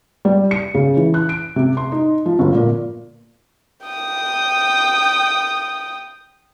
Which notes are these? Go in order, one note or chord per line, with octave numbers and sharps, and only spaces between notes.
G3
C#7
C#3
E3
F#6
D7
C3
C6
D#4
F3
G1
A#2
G5 D#6